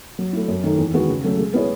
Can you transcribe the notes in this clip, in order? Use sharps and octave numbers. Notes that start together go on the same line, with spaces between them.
F#3
A3 E4
F#2
D#3 A3 D#4 A4
E2
D#3 G#3 B3 F#4
C#3
F#3 A3 C#4
G#3
B3 E4 G#4 C#5